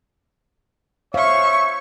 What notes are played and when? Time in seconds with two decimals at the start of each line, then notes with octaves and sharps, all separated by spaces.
1.14 C5 C#5 E5 F5 C#6